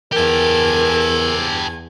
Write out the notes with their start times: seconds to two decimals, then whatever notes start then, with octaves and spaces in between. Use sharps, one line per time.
0.12 E2 G4 A4 A#4 G#5